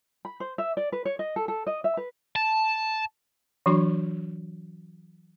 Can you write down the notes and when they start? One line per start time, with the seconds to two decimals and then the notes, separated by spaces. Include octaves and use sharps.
0.25 B5
0.40 C5
0.58 E5
0.77 D5
0.92 B4
1.05 C#5
1.19 D#5
1.36 A4
1.48 A4
1.67 D#5
1.84 E5
1.97 B4
2.36 A5
3.66 E3 F#3 D4 F#4 C6 C#6